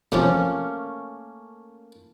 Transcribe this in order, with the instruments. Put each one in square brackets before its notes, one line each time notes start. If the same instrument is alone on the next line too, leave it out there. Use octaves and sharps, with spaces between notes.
[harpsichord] C3 F3 [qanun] A3 A#3 C#4